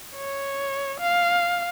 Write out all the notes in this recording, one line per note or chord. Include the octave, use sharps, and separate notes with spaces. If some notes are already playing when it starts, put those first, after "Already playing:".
C#5
F5